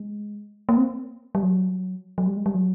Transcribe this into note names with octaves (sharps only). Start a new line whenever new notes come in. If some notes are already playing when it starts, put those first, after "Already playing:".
Already playing: G#3
A#3
C4
G3
F#3
F#3
G3
G#3
G3
F#3